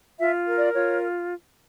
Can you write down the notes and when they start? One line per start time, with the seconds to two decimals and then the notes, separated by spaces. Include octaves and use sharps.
0.19 F4 E5
0.47 A#4
0.57 D5
0.75 F4 C#5